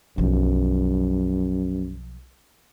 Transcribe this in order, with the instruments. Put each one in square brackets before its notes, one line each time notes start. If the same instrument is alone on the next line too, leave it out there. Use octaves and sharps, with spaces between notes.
[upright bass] B1 F3 [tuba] F#2